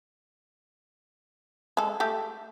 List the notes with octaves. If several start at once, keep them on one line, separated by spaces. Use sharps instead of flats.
G#3 A4
A3 G4 A4